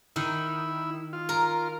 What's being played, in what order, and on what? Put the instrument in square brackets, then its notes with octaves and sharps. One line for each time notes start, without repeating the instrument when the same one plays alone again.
[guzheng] D#3 [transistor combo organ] E4
[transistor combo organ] F4
[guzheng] A#4